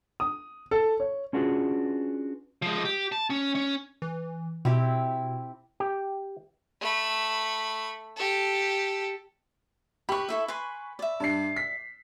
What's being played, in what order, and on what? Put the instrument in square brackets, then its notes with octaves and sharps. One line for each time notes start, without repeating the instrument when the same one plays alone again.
[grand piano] D#6
A4
C#5
[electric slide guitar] C#4 D4 F4 F#4 G#4 B4
[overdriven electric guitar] F3 G#3
G4
A5
C#4
C#4
[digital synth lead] E3
[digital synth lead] B2 [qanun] C4 E4 G4
[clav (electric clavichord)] G4
[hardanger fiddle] A3 B5
G4 A4
[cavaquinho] G4 B4 [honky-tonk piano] B5 C#6
[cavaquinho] E4 A4 E5
B4 G#5 C6
D5 E5
[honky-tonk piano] G2 D4 C7
B6